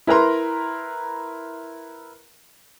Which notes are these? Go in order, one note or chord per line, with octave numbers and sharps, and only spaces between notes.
E4 A#4 B4 A#5 C6